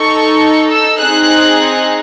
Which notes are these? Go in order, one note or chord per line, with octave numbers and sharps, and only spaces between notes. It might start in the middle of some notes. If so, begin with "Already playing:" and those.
Already playing: D#4 A4 C#6
E6
C4 D#4 G#4 F#6